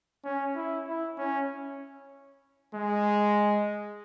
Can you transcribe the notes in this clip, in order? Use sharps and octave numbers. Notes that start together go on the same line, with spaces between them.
C#4
E4
E4
C#4
G#3